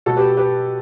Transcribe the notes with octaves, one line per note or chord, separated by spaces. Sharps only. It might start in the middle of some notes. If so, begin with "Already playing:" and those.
B2 F#3 A3 F#4 A4
G4 B4
G4 B4